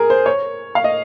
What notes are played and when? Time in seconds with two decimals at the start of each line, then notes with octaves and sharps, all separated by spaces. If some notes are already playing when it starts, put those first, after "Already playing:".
Already playing: G#4 A#4
0.10 C5
0.26 C#5
0.75 F5
0.84 D#5